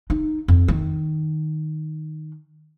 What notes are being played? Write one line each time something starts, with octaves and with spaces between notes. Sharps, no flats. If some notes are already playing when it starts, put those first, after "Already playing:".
D#4
F2
D#3